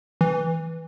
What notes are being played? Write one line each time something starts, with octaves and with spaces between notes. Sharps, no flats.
E3